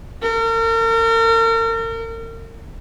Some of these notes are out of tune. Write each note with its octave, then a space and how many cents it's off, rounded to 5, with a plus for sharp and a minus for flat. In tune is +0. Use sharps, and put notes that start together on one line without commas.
A#4 -40